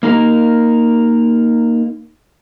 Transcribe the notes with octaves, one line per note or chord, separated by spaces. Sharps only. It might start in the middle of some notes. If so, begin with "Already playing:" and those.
A#3 D#4 A#4